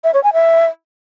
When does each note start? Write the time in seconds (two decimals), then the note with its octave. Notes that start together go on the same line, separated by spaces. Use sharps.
0.04 E5
0.14 C#5
0.24 G#5
0.33 E5